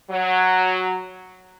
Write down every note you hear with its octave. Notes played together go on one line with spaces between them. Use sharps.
F#3